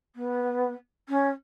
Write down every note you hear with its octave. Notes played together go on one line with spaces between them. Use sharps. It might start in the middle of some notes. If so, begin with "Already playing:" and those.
B3
C#4